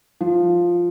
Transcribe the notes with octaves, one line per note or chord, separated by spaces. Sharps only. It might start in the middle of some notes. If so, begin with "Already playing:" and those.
F3